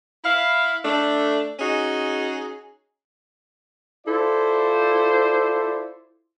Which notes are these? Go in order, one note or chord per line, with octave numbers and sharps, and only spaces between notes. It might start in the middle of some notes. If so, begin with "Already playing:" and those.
E4 F5
A3 D4
C#4 D#4 F#4 G#4
E4 F4 A4 C5 D5